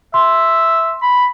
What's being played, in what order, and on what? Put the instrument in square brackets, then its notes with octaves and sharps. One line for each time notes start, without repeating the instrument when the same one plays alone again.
[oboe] E5 [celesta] C6
[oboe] B5